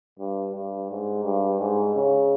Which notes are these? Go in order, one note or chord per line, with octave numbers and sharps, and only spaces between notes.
G2
G2
G#2
G2
G#2
C#3